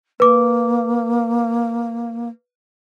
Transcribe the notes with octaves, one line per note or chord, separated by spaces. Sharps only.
A#3 B4 D6